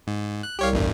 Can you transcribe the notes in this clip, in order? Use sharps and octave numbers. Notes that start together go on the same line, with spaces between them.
G#2
F#6
C2 G4 C#5 F5
A1 E2 G2